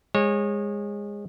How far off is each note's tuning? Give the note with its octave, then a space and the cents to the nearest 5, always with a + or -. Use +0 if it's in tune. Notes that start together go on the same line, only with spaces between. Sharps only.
G#3 -20 C#5 -30